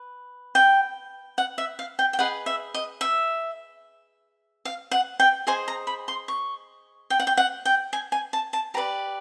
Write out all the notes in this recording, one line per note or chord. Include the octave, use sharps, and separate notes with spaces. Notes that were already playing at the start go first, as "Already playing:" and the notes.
Already playing: B4
G5
F#5
E5
F5
G5
G5
G#4 B4 D#5 F#5
E5
D#5
E5
F5
F#5
G5
G#4 C5 D#5 G#5
A#5
B5
C6
C#6
G5
F#5
G5
F#5
G5
G#5
G#5
A5
A5
G4 B4 D5 A#5